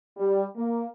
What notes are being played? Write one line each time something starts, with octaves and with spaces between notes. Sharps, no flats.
G3
A#3